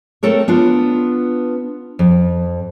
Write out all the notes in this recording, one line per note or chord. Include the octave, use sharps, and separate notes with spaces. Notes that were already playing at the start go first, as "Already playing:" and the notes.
A3 C4 A4 A#4 C#5
B3 D4 F4
F2